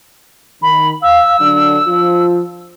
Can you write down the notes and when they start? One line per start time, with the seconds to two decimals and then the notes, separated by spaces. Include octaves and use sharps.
0.62 D#3 B5
1.03 F5 E6
1.40 D3 F#3 D4
1.87 F3 F4